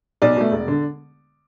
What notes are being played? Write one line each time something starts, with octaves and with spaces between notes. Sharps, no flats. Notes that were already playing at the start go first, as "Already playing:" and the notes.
B1 D5
B2 A3
E1
D3